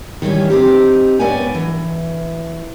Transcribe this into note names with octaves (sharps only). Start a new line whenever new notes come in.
D#3 E3 G3 C#4
C4 D#4 G4
G#2 B3 C#4 D5 G5 G#5
E3